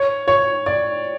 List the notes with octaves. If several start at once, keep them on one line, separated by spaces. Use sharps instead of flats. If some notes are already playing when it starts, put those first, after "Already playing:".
Already playing: C#5
C#5
D5